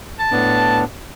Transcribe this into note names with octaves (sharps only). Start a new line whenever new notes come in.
A5
A2 B3 D4